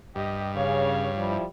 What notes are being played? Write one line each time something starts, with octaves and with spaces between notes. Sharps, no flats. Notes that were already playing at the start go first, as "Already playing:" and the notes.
G2 G4 D#5
C#3 C#5 F5
F3 G3 E4